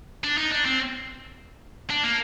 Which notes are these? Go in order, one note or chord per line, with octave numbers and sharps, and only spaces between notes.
D4
D#4
D4
C4
D4
A#3